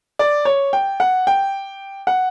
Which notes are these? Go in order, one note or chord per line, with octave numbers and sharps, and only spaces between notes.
D5
C#5
G5
F#5
G5
F#5